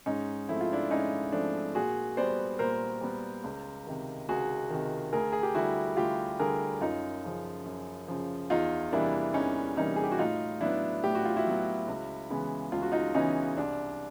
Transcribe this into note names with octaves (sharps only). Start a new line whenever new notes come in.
G#2 C#4 D#4
F3 A3 C4 E4
F4
D4 E4
G#2 C#4 D#4
F3 A3 C4 D4
A#2 F#4 G#4
G3 B3 C5 D5
A#2 A#4 C5
G3 B3
C#2
C3 D#3
C#2 F#4 G#4
C3 D#3
D2 G#4 A#4
G#4
G4
D3 G3 E4 F#4
D2 F4 G4
D3 G3 G#4 A#4
F#2 D#4 F4
C#3 F3
F#2
C#3 F3
E2 D#4 F4
C3 E3 G3 A#3 D4 E4
E2 C#4 D#4
C3 E3 G3 A#3 C#4 D#4
G#4
G4
F#4
A2 D#4 F4
F#3 B3 D4 E4
A2 G4
F#4
F4
E4 F#4
F#3 B3
C#2
C#3 E3 G#3 B3
C#2 F4
F#4
D#4 F4
C#3 E3 G#3 B3 C#4 D#4
C2 D4